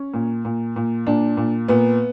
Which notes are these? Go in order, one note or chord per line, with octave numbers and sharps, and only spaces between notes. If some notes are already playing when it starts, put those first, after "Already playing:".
Already playing: C#4
A#2
A#2
A#2
A#2 D4
A#2
A#2 B3